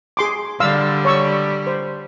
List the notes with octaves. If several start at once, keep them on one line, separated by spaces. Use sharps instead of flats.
G#4 C6 D6
D3 G3 F5 C6 E6
C#5 C#6 E6
C5